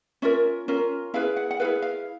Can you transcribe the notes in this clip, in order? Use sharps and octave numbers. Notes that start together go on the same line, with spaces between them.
C#4 F4 A#4 E5
C#4 F4 A#4
E4 G#4 B4 F5
F#5
F#5
E4 G#4 B4 F5
F5